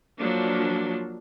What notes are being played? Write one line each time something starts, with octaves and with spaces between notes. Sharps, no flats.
F3 F#3 A#3 D4